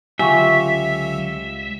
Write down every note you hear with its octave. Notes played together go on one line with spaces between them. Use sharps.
C#2 D3 F#3 F4 G4 E5 G#5 C#6